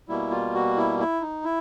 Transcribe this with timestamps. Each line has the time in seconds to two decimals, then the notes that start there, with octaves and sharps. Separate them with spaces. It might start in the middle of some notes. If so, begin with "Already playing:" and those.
0.08 B2 G3 A#3 E4
0.31 F4
0.54 F#4
0.77 E4
0.99 E4
1.21 D#4
1.44 E4